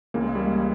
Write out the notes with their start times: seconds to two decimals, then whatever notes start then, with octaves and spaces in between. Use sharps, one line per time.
0.14 C#2 C#3 E3 A#3
0.24 G#3
0.35 G3
0.45 G#3